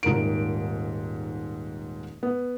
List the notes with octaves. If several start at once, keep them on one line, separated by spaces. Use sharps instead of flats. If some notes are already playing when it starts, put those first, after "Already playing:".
D#1 G#2 A#4 D7
B3